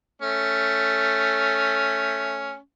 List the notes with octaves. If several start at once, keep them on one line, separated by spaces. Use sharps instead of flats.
A3 C#4